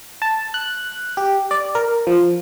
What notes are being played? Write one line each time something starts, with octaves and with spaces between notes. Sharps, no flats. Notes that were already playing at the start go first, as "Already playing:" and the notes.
A5
F#6
G4
D5
A#4
F3